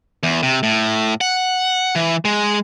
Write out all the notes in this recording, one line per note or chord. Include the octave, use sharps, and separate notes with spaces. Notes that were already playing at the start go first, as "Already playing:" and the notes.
E2
C3
A2
F#5
E3
G#3